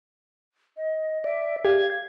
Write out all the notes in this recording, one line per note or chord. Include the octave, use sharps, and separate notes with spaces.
D#5
D5 E5
G4 F5 G#6
F5